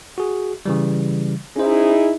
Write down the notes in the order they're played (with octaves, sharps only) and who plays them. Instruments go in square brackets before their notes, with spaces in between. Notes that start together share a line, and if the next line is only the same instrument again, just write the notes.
[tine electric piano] F#4 G#4
C#3 E3 G3
[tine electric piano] C#4 C5 [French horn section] D#4 E4 G#4